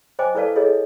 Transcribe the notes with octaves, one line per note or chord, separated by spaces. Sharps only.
C5 D#5 G5 G#5 D6
E4 A4 B4 D5 F5 A5
E4 G#4 A4 C#5 D#5